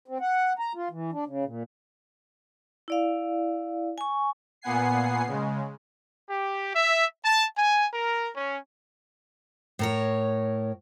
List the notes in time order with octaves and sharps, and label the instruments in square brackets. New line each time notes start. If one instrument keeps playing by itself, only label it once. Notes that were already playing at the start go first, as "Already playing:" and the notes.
[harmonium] C4
F#5
A#5
F4
E3
D4
C#3
A#2
[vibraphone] E4 D5 F5
G#5 C#6
[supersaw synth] A#2 B3 F#5 G#5 C7
C#3 G#3
[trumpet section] G4
E5
A5
G#5
A#4
C#4
[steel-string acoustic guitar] A2 A#4 C#5